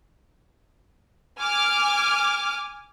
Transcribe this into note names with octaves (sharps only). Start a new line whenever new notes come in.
G#5 D6 F6